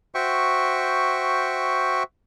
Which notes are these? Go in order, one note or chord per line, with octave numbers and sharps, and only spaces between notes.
F#4 C5 E5 G5 C#6